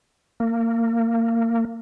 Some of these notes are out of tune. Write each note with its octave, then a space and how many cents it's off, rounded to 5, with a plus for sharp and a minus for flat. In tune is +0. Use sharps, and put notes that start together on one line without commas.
A#3 -25